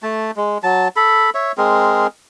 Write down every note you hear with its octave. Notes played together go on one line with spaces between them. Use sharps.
A3 A5
G#3
F#3 A5
A4 B5
C#5 E5
G#3 C4 G#4 A#4